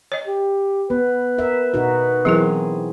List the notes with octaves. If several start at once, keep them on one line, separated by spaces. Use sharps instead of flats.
C#5 D#5
G4
B3 B4
A#4 E5
B2 D#4 F#4
E3 F#3 C4 E4 G#4 A#4